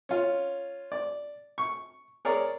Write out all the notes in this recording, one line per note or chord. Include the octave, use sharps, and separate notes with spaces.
C#4 F4
D5
C#6
G#4 A#4 C#5 D5